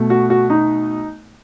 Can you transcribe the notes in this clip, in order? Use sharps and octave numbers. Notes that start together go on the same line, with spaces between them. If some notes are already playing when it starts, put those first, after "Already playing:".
Already playing: B2 A3
F#4
F#4
D#4